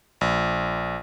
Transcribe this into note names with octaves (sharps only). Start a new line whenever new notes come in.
A#1